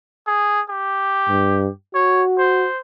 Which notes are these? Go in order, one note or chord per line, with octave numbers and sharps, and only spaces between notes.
G#4
G4
G2
F#4 C#5
C5